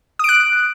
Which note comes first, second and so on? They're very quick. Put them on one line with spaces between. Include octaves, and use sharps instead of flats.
D#6 D7 F#6